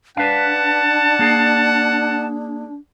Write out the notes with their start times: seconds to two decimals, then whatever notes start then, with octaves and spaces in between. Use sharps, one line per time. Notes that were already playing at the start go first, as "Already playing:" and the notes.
0.17 D4 B4 F5 F#5 A5
1.19 A#3 G#4